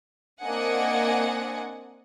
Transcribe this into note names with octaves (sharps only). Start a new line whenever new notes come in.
A#3 C4 D4 D#5 F#5 G#5